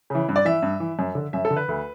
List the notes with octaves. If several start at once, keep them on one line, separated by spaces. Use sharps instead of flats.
C#3 E3
G2
D5
E3 E5
G2
E3
F#2
D3
F#2 E5
A4
D3
B4
D2